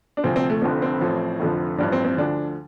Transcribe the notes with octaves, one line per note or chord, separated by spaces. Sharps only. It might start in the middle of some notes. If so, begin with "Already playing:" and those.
D4
D2 C3 F3 C4
C4
A3
F1 F2 D3 F3 C4
C4
A1 A2 F3
F1 F2 D3 F3
A1 G2 F3 D4
C4
C4
D2 D3 F3 D4